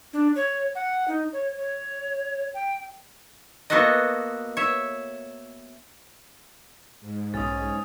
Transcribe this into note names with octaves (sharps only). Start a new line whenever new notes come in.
D4
C#5
F#5
D#4
C#5
C#5
G5
A#3 B3 F#4 A4 B4 D#5
C#5 E5
G#2
B1 C#4 D#6 A6